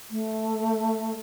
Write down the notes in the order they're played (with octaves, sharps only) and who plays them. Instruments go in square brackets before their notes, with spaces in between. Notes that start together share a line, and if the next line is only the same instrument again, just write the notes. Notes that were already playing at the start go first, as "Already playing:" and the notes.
[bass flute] A3